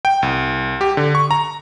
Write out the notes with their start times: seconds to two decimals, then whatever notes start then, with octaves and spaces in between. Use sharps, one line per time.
0.05 G5
0.23 C2
0.81 G4
0.97 D3
1.15 C#6
1.31 A#5